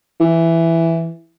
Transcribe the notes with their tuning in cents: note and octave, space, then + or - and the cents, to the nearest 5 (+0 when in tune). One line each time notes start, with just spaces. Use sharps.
E3 +5